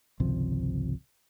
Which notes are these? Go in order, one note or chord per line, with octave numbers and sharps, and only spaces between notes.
G#1 C#2 C3 F3